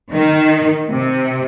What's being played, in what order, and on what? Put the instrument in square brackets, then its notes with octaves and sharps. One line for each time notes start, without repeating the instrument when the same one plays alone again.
[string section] D#3
C3